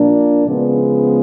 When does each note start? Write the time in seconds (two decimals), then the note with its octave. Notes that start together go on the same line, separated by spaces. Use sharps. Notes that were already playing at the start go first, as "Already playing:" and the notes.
Already playing: A#2 F3 A#3 D4
0.47 C#3 F3 G#3 B3